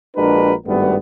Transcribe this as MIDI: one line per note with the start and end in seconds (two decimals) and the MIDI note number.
0.17 0.54 34
0.17 0.54 56
0.17 0.54 62
0.17 0.54 66
0.17 0.54 70
0.17 0.54 71
0.66 0.96 32
0.66 0.96 43
0.66 0.96 55
0.66 0.96 57
0.66 0.96 59